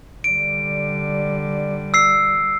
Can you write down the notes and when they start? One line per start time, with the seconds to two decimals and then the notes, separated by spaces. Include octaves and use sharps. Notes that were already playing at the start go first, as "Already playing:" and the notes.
0.24 D3 G3 D7
1.94 E6 C7